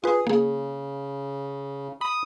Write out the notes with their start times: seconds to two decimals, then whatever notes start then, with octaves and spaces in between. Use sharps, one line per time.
0.04 F4 G#4 B4
0.27 C#3 A#3 G#4
2.01 B5 D#6